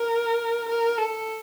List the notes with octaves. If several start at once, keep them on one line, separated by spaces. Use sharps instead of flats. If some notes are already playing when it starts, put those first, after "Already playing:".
Already playing: A#4
A#4
A4